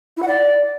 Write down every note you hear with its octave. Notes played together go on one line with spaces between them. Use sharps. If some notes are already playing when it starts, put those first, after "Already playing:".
E4
F#5
D5